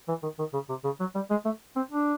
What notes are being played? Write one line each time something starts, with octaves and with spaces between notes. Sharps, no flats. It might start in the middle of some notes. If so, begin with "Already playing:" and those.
E3
D#3
D#3
C#3
C3
C#3
F#3
G3
G#3
A3
C4
D4